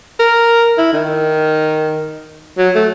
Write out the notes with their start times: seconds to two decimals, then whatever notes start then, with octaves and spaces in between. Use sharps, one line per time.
0.19 A#4
0.78 E4
0.93 D#3
2.58 F#3
2.75 A3